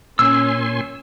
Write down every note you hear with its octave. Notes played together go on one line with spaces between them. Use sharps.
A#2 C#4 G#5 C6 E6